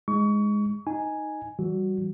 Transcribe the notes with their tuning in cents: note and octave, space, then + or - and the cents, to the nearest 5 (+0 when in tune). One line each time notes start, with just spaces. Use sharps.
G#3 +0 D#4 +0 C#6 +30
D#4 +0 G#5 +0
E3 +0 G3 -20 F#4 +0